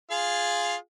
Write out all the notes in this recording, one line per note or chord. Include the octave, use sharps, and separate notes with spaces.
F4 G#4 F5